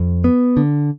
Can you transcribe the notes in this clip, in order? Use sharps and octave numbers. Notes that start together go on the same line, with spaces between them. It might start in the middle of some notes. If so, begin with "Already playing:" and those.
Already playing: F2
B3
D3